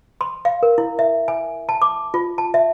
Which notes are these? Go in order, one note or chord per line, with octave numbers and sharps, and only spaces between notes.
C6
F5
A#4
E4
E5
G#5
A5
D6
F4
A5
E5